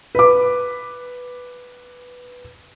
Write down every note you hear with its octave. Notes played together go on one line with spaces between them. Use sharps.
B4 D6